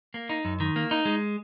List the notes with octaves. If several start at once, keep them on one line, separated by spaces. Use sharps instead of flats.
A#3
D#4
F#2
D#3
A#3
D#4
G#3